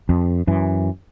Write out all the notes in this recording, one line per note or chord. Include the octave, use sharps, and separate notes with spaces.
F2
F#2 E3